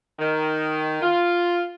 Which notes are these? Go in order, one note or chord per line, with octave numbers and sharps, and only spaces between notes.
D#3
F4